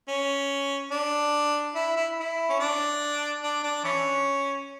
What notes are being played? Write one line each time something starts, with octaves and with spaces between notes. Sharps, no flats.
C#4
D4
E4
E4
E4
C#4
D4
D4
D4
E3 C#4